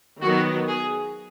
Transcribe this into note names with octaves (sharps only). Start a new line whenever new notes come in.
D#3 F#3 B3 F#4
G#4